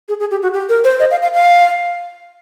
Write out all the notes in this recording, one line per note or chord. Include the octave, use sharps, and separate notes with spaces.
G#4
G#4
G4
F#4
G4
A#4
C5
D#5
F5
F5
F5